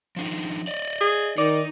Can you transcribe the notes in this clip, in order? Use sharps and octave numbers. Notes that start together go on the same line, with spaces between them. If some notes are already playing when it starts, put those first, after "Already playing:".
F3 D4 D#4
D5 D#5
G#4
D#3 D#4 D5